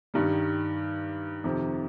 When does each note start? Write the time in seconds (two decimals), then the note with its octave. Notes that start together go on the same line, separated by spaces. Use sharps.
0.14 G2 D#3 G3
1.44 F2 C3 D#3